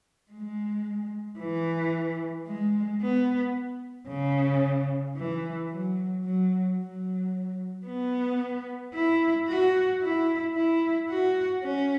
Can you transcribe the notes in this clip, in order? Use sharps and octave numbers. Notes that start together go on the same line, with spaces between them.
G#3
E3
G#3
B3
C#3
E3
F#3
F#3
F#3
B3
E4
F#4
E4
E4
F#4
C#4